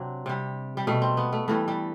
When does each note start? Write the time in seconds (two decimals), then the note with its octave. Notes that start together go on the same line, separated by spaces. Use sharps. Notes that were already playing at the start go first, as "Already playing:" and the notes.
Already playing: C3 F#3 C4 D4
0.26 C3 G3
0.77 G3
0.87 B2 G3 A3
1.02 C4
1.17 B3
1.33 A3
1.48 G2 E3 G3 A3
1.68 G3